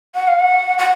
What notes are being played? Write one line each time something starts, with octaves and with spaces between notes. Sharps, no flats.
F#5
F5
F#5
F#5